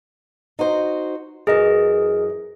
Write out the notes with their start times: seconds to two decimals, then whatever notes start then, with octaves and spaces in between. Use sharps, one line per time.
0.59 D#4 F#4 C5
1.47 F#2 E3 G#4 A#4 D#5